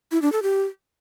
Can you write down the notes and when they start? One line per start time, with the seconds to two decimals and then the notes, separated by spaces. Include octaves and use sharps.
0.12 E4
0.22 D4
0.32 A4
0.43 G4